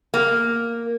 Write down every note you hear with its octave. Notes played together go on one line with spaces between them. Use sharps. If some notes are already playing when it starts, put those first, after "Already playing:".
A#3